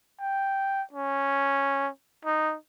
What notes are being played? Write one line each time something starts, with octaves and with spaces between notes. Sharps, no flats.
G5
C#4
D#4